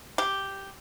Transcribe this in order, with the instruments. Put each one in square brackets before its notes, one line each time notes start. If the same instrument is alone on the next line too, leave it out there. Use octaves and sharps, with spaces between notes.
[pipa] G4